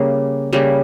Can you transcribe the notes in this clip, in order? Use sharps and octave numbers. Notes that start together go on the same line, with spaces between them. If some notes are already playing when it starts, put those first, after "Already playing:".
Already playing: C#3 G3 A#3
C#3 G3 A#3